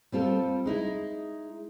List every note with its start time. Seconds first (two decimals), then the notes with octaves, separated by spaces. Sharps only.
0.12 G3 C4 F4 A4
0.66 G#3 D#4 E4